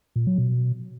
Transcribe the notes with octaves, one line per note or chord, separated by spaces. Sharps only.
A#2
F#3
B2